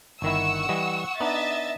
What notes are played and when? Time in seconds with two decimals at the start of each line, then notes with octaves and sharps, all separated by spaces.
0.22 G1 D#3 E4 F#5 C#6 E6
0.69 E3 G3 D#5
1.20 B3 D4 D#4 D#5 E5 A6